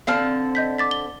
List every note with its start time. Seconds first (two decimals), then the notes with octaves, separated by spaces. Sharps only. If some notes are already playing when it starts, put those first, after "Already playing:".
0.07 D3 C4 F5 A5 F6
0.55 D#5 G6 B6
0.78 D6 A6 B6
0.91 G7